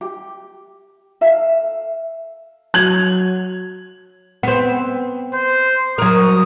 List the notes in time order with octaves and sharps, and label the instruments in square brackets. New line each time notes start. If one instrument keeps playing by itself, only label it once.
[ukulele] G4
A4 E5 F5
[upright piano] F#3 G#6 F7 F#7
[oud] B3 C4
[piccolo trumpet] C5
[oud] F#3 A#4 [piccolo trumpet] D#6